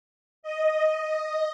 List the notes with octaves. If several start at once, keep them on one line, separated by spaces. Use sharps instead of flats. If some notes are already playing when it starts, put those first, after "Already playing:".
D#5